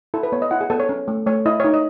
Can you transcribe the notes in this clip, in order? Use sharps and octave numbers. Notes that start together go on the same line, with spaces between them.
E4 A4
B4
B3 C#5
D#5
E4 F#5
G#4
B3 A4
C#5
C#4
A3
A3 C#5
E4 D#5
D#4 C#5
D#5